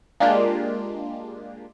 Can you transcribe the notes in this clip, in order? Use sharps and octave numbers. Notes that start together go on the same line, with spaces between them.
G#3 A#3 D4 F4 G4